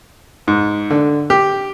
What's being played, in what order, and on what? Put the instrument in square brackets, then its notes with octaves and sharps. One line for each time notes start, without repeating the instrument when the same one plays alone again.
[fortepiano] G#2
D3
G4